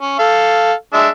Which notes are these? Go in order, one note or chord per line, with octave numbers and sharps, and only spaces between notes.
C#4
A4 F5
G#3 D4 E5